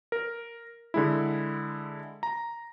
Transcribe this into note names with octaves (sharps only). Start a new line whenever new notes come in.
A#4
D3 G#3 E4
A#5